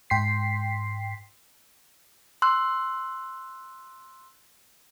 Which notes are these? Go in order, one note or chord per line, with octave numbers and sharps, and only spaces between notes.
G#2 G5 C6 B6 C7
C6 E6 F#6